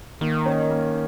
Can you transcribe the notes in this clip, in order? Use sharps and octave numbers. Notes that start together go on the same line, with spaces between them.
D#3 A#3
C#4
A#3